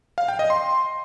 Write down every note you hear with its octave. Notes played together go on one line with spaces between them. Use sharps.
F5
G5
D#5
C6